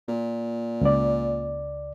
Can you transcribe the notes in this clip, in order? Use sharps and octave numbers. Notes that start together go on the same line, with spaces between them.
A#2
C#2 D5